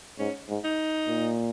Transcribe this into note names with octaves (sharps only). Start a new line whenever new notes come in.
G#2 C#4
G#2
D#4
A#2